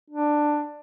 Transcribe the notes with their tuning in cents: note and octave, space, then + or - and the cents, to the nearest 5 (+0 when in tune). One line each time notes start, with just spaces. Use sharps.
D4 +10